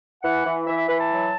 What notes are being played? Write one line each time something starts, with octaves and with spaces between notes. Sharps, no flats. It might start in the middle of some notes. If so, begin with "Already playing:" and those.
E3 F#5
E3
E3 E5
E5
E3 B4
A5
F#3